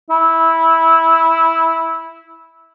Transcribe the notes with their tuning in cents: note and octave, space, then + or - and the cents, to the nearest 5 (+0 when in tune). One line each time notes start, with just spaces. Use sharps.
E4 -10